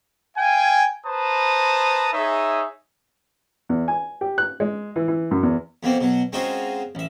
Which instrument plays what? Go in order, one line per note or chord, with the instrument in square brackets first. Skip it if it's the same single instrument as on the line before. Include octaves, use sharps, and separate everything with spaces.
[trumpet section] F5 G5 G#5
B4 C5 A5 A#5 D#6
D#4 G#4 C#5 E5
[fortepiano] E2
G#5
G4
F#6
G#3
E3
E3
F#2
E2
[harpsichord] F2 B2 A#3 C4
B2 F#3
G#3 C4 C#4 D#4 F4 F#4
A1 E5